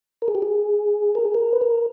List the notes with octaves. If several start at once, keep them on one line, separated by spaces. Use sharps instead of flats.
A#4
G#4
G4
G#4
A#4
G#4
A#4
B4
A#4